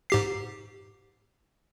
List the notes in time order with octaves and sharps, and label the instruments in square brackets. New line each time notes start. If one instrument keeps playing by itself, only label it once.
[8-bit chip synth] G#2 G4 C7